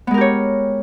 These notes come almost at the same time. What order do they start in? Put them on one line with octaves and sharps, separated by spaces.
B3 G#3 A#4 G4 C#5